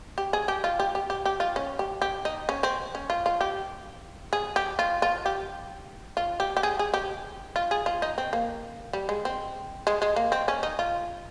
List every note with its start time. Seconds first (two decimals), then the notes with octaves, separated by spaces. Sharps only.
0.18 G4
0.33 G#4
0.48 G4
0.64 F4
0.80 G4
0.95 G4
1.10 G4
1.25 G4
1.40 F4
1.56 C#4
1.79 G4
2.02 G4
2.25 D#4
2.49 C#4
2.63 C4
2.95 C#4
3.10 F4
3.26 F4
3.41 G4
4.33 G#4
4.56 G4
4.79 F4
5.02 F4
5.26 G4
6.17 F4
6.40 G4
6.57 G4
6.63 G#4
6.79 G#4
6.94 G4
7.56 F4
7.71 G#4
7.86 F4
8.02 D#4
8.18 C4
8.33 A#3
8.93 G3
9.09 G#3
9.25 C4
9.87 G#3
10.02 G#3
10.16 A#3
10.32 C4
10.48 C#4
10.63 D#4
10.79 F4